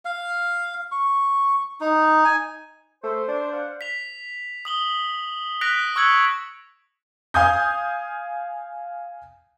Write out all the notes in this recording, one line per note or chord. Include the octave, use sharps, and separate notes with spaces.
F5
C#6
D#4
G#5
A3 C5
D4
C5 F5 F#5
B6 F7
D#6 F#7 G7
F#6 A#6 B6 D7 F7
C#6 E6 F#6 G#6 C#7 F#7
F5 G#5 D#6 G6